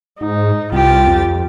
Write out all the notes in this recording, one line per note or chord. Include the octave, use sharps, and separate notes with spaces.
G#2 D#4
C2 F4 G4 A6
F2